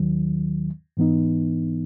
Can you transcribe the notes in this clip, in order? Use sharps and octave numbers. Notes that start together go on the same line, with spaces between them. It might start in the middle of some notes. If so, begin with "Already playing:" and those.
Already playing: D#2 D#3 F#3
G#2 E3 B3 D#4